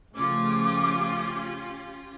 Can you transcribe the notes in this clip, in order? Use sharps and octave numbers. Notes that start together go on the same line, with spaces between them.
C#3 F3 A3 C#4 F4 G4 D6